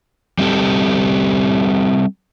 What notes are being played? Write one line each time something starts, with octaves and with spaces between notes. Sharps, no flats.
G3 C4 G4 A4